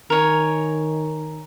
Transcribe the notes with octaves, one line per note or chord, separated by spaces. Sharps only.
D#3 A#4 C#5 G#5